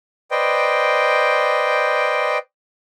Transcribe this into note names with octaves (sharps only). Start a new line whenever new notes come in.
B4 C5 D5 D#5 G5